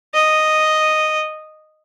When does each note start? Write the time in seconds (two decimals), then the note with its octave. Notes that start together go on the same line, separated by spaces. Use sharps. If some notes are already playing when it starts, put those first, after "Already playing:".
0.14 D#5